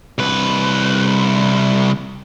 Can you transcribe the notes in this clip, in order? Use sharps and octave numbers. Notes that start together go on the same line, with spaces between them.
C2 B4